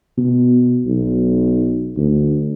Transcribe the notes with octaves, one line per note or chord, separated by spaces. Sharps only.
B2
B1
D2